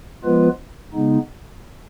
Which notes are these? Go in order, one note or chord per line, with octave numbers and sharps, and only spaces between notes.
F3 G#3 B3 F4 B4
C#3 G#3 B3 D#4